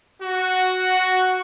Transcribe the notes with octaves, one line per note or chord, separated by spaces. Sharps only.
F#4